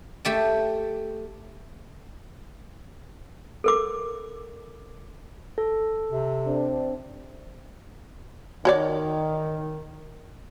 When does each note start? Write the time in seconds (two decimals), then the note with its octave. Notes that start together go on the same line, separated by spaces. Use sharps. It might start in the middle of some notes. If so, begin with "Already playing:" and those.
0.25 A3 G4 A5
3.64 A4 A#4 D6
5.58 A4
6.10 C3
6.44 C4 D4
8.65 D#3 F#4 C#5 D5